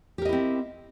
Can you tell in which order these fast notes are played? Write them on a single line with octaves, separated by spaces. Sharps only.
G4 A#4 D#5 E4 C4